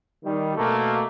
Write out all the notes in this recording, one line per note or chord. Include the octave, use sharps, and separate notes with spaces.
D#3 G3
B2 A3 A#3